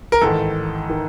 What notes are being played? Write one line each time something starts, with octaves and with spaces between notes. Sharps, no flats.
A#4
A1 G#2 D#3 A4
D#3